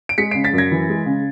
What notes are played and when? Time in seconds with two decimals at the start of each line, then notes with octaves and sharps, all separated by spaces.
0.09 D7
0.18 G#3 B6 C#7
0.31 C#3 C7 D7
0.44 A6 B6
0.53 F#2
0.58 G#6 A#6
0.71 E3
0.89 G#3
1.06 C#3